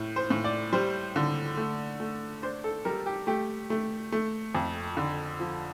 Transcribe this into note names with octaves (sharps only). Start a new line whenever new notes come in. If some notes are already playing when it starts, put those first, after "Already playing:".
Already playing: A2
C5
A2
D5
G3 C5
D3
A3
A3
D4 C5
A4
G3 A#4
G4
A3 G4
A3
A3
F2
D3
F3